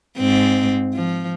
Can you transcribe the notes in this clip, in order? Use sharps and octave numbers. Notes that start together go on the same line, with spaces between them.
G#2 C4
F3